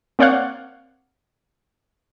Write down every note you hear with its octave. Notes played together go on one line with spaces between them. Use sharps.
A#3 C4 C#5 D5 F5 F#5